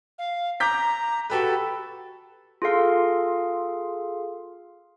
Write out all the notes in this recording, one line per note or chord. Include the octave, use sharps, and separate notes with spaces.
F5
A#5 D6 G6 B6
F#4 G4 A4 B4
F4 G#4 A4 F5 C6